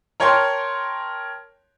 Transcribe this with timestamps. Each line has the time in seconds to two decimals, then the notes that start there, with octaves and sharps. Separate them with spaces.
0.20 A#4 C#5 G5 A5 C6 F6